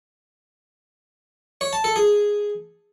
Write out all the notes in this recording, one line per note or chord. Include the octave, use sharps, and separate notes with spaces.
C#5
A5
A4
G#4